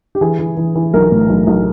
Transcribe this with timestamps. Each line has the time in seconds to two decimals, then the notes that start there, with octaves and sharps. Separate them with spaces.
0.15 G4
0.21 E3 G#4
0.39 E3
0.57 E3
0.75 E3
0.94 B1 A#4
1.12 A2
1.30 B1
1.47 B1